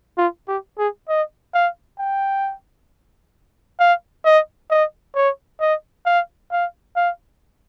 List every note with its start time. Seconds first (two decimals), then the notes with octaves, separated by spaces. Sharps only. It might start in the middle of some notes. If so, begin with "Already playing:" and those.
0.18 F4
0.48 G4
0.78 G#4
1.09 D#5
1.54 F5
1.99 G5
3.80 F5
4.25 D#5
4.70 D#5
5.16 C#5
5.60 D#5
6.06 F5
6.52 F5
6.96 F5